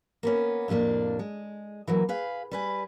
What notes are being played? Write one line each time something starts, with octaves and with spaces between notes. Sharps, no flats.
A#3 B3 C#4
F2 A2 C3 A#3 D4
G#3
E3 F#3 A#3
G#4 B4 F5
G3 B4 G#5